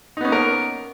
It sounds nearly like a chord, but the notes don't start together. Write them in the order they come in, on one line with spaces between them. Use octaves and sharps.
D#4 B3 C#4 A#3 A#4